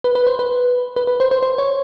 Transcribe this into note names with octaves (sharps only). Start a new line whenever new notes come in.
B4
B4
C5
B4
B4
B4
C5
C5
C5
C#5